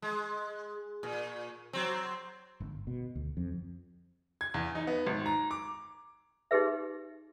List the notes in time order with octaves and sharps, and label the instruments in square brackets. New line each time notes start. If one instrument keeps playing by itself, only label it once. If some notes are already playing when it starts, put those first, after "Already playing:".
[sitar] G#3
A#2
F#3 C4
[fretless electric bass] G1
B2
D2
F2
[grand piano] G#6
E2
D#4
B3
G#1
A#5
D6
[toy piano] D#4 G4 G#4 B4 E5